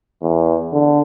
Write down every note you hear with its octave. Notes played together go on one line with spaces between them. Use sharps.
E2
D3